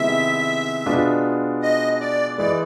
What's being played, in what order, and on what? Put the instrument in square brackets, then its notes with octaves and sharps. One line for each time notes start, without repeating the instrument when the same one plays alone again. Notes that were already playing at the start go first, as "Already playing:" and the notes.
Already playing: [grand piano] C3 D#3 G#3 B3 E4 [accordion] E5
[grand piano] B2 G#3 B3 D4 F4
[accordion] D#5
D5
[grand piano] E3 G#3 [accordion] D5